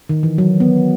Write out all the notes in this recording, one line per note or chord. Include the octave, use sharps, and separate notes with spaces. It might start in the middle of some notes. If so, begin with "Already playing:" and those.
D#3
E3
F#3
B3